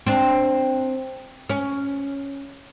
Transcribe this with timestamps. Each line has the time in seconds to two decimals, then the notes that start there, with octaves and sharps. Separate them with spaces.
0.07 C4 D4
1.50 C#4